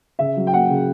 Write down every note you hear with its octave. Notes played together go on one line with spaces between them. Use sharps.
C#3 E5
F#3
G5
A#3 F#5
C#3